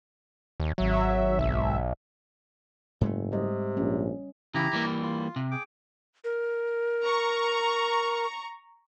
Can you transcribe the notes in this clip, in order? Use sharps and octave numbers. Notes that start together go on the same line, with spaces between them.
D#2
G#1 F#3 E5
B1
F#1 G#2 G#3 A3
C3 G3 D#5
A#1 C#4
C#3 E3 E4 G4 A#5
E3 G3 A#3
F4
C3
G#4 G5 D6
A#4
A#5 C#6